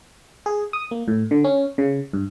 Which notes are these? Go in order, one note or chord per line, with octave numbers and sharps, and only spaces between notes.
G#4
D#6
A#3
A2
D3
C#4
C#3
G2